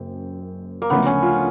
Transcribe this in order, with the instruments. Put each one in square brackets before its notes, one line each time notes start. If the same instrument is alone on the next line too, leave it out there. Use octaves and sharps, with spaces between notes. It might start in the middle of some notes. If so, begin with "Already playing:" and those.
Already playing: [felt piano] F#1 F#2 [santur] C4
[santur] A#3
[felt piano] D2 C#3 F3 A3 D4 [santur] B3
[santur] C#4
F4